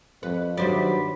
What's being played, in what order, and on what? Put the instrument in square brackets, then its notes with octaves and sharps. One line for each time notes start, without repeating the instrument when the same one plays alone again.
[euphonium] F2 [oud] B4
[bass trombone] G2 [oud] D#3 C5 D5 [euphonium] F#3 [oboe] B5